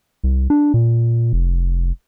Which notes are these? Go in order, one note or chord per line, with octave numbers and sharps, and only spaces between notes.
C2
D4
A#2
F1